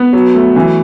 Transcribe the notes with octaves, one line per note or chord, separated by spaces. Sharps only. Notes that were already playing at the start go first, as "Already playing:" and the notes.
Already playing: B3
F#3
A3
E3